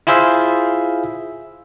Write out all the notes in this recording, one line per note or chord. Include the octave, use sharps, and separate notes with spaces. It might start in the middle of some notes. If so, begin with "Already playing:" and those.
E4 F4 G#4 C5 E5 F5